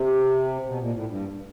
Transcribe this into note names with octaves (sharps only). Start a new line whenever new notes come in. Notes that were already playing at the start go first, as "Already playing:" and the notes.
Already playing: C3
B2
A#2
A2
G2